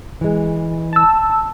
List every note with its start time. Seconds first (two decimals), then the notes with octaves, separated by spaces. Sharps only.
0.21 E3 G#3
0.93 A5 E6